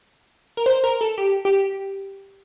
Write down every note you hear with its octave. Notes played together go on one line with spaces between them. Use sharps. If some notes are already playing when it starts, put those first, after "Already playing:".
A#4
C5
A#4
A4
G4
G4